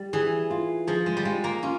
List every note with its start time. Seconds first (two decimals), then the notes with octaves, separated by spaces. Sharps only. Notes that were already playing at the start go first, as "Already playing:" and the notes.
Already playing: G3
0.13 E3 G#4
0.50 F4
0.87 F3 G#4
1.06 G#3
1.17 G3
1.25 G#3 F4
1.44 A#3
1.63 C#4 F4